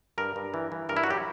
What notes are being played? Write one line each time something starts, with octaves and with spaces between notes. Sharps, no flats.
G2 A#4
G2
E3
E3
G2 A#4
E4
F#4
F#3 G4